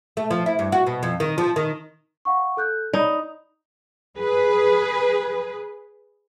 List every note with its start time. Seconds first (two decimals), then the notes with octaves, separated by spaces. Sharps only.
0.17 A3
0.31 F3
0.46 E4
0.59 G2
0.72 F#4
0.87 B2
1.03 F2
1.20 D#3
1.38 F3
1.56 D#3
2.25 F5 F#5 C#6
2.57 A4 F#6 G6
2.93 D#4 C#5 D5 B5
4.17 G#4 B4